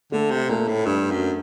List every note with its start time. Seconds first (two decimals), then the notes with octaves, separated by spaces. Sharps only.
0.12 D3 A3
0.30 C3
0.49 A#2 A3
0.68 A2
0.86 G2 D4
1.11 F#2